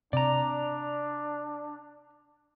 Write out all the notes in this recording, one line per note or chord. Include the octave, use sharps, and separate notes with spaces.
C3 D4 D5 A#5